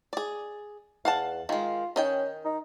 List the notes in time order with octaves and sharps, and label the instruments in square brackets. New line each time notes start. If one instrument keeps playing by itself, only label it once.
[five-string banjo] G#4 D5
[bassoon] E2 [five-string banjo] F5 F#5 A5
[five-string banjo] D#3 G#3 [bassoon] F4
[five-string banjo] D#3 D#5 G5 [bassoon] C#4
[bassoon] D#4